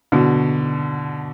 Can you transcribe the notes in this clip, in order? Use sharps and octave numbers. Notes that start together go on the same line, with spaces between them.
B2 D3